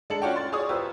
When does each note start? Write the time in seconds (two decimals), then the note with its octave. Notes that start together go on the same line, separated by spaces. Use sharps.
0.10 G#3 D4 A4 A5 C#7 F#7
0.22 C#4 F4 F#4 C#5 D5 G5
0.36 C6 A6
0.52 G#4 C#5 D5 C#6 D#6
0.69 E1 F4 G4 B4 C5 E6